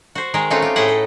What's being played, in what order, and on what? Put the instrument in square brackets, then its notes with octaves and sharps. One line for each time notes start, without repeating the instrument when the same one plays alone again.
[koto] F#4 C5
D#3 G#3 G#4 A#4
A3 C4 C#4 D#4 F4 F#4
F4 G4
A2 G#4 B4 D#5 F#5 G5
A4